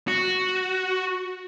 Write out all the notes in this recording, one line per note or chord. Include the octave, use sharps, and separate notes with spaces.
F#4